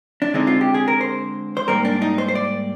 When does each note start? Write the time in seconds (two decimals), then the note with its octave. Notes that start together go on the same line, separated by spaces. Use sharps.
0.22 D4
0.34 D3 G#3 C4 D#4
0.47 F4
0.61 G4
0.74 G#4
0.88 A#4
1.01 C5
1.57 C5
1.68 G#2 G3 A#3 A#4
1.85 D4
2.02 D#4
2.18 C5
2.28 C5
2.35 D5